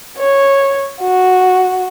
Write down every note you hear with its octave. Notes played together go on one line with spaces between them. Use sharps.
C#5
F#4